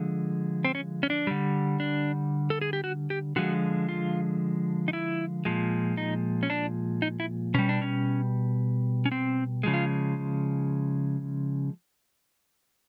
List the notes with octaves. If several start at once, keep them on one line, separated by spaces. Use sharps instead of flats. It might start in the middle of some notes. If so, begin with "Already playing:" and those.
Already playing: D3 F3 G#3
C4
C#4
C#4
D4
D3 G3
D4
A4
G#4
G4
F#4
G4
D3 F3 G#3 F#4
F4
D#4
E4
A#2 F3 G#3
D#4
C#4
D4
D#4
E4
B2 G3 C#4
D4
C#4
C#4
C4
C#3 F3 G#3
F4